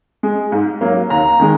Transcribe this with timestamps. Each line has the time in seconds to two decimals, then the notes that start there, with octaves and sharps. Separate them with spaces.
0.23 G#3
0.52 G#2
0.81 F#3 A#3
1.10 D#2 A#5
1.40 D#3 G#3